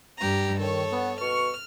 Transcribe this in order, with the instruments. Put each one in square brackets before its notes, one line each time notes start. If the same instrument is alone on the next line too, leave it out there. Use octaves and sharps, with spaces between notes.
[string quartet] G2 G4 A#5
[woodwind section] D#2 D#3 [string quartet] A4 C#5
[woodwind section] B3
[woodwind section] B2 C#6 [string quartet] F6